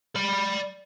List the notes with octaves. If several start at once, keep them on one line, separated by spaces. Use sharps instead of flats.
D5 B5